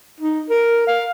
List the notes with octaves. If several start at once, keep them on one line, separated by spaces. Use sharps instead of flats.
D#4
A#4
F5